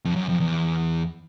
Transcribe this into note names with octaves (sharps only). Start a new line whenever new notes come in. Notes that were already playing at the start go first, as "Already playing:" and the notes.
F2
F#2
F2
E2